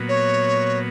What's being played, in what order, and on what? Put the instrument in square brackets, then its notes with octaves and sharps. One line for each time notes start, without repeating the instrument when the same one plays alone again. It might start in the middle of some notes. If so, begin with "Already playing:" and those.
Already playing: [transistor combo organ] A#2 F#3 B3
[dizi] C#5